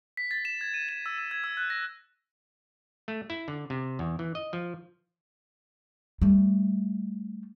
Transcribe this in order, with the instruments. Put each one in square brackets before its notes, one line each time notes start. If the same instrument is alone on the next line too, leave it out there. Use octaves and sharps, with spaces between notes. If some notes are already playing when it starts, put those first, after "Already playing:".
[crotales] B6
A6
E7
G#6
D#7
E7
E6
E6
G#6
E6
F#6
A#6
[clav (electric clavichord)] A3
E4
D3
C3
E2
E3
D#5
F3
[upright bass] G3 A3